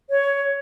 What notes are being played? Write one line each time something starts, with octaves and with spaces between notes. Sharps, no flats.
C#5